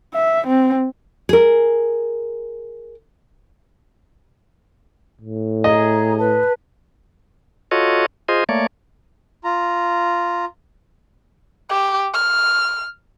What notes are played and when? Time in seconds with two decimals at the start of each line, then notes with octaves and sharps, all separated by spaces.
0.14 E5
0.47 C4
1.29 G#4 A#4
5.21 A2
5.64 G#4 D#5 G#5 A#5
6.18 B4 A5
7.71 F4 F#4 A4 C#5 D#5
8.28 F4 G#4 C5 D#5
8.49 A3 A#3 C#5 D5
9.44 F4 A#5
11.70 G4
12.14 F6